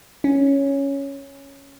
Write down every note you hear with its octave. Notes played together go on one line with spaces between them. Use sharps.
C#4